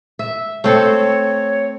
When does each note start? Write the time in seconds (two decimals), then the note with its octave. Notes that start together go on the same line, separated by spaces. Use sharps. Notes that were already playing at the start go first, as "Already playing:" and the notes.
0.19 E5
0.64 A3 C4 A4 C#5